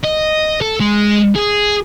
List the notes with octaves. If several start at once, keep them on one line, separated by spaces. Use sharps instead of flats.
D#5
A4
G#3
G#4